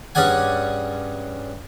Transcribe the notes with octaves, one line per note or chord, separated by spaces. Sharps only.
G2 C#4 G#4 D5 F#5 G#5